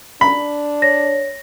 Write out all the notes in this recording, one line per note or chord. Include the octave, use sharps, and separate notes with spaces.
D4 B5
C#5 A#6